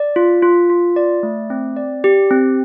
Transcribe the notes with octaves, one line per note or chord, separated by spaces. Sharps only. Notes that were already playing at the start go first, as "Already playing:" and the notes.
Already playing: D5
F4
F4
F4
D5
A3
C4
D5
G4
C4